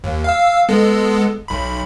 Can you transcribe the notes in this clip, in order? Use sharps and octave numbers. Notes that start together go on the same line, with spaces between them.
D#2
F5 E6
G#3 B3 A4
B1 B5